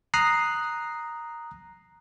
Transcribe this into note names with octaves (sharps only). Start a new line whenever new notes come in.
A#5 D#6 F#6 C7